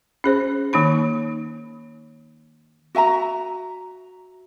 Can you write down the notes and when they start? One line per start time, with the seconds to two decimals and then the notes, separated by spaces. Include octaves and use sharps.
0.24 C#4 G#4 C5
0.73 D#3 A#3 D#4 B5
2.95 F#4 E5 G#5 A#5